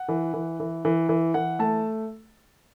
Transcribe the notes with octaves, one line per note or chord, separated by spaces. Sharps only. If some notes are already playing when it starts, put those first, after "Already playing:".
Already playing: F#5
E3
E3
E3
E3
E3
E3 F#5
A3 A5